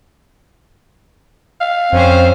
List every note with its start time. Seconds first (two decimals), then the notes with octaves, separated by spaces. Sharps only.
1.61 F5
1.93 F2 C4 C#4 C5